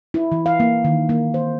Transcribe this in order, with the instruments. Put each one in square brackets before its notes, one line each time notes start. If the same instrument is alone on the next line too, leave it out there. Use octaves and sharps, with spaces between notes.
[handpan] E4
E3
F5
A#3
D#3
A#3
C5